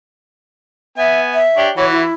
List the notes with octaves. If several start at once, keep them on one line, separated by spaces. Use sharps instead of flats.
B3 E5 G#5
E5
D4 G4 C#5
E3 F#4 C#5
E4